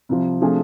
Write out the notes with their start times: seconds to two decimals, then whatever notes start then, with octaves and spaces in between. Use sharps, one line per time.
0.09 C2 C3 F3
0.40 C3 F3 A3 D4 G#4